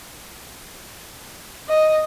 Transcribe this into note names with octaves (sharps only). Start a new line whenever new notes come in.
D#5